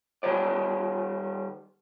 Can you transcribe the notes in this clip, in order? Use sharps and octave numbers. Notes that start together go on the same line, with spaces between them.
D#3 G3 C#5 D5